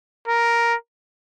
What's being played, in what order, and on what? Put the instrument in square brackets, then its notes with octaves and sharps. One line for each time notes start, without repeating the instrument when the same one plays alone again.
[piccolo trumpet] A#4